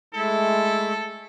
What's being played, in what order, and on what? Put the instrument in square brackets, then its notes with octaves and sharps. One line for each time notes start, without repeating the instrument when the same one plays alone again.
[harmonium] G#3 A3 [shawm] E4 [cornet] A4